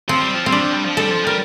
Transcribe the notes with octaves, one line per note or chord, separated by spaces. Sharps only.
F3 C4
G3
F3
G3 C4
D4
F3
G3
F3
G3 A4
F3
G3 A#4